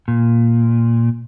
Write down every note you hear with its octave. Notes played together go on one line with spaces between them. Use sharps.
A#2